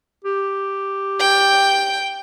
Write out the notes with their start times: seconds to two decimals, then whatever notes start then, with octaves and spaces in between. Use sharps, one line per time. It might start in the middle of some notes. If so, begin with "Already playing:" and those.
0.25 G4
1.20 G5